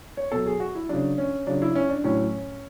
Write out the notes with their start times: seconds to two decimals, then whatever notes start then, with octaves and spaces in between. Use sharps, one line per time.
0.17 C#5
0.32 B2 F#3 A4
0.46 G#4
0.60 F#4
0.75 E4
0.89 C#3 F#3 D4
1.18 C#4
1.47 C#3 F#3 D4
1.62 E4
1.75 C#4
1.90 D4
2.04 A2 F#3 C#4